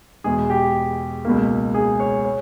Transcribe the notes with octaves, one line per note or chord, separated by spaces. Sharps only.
E2 B2 G#3 G#4
G4
C#2 B2 A#3
G#4
C#5
C#5